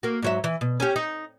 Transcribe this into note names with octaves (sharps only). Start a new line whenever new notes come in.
A#3 F#4
G#2 F#3 E5
E3
B2
C#4 G4
D#4